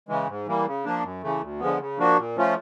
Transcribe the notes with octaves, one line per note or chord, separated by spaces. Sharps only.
C#3 E3 G#3
G#2
E3 G3 A#3
C#3
F3 A#3 D4
F#2
C#3 E3 A3
D2
D3 F3 G#3 B3
C#3
F3 A#3 D4 F#4
A#2
F3 A3 C#4 F4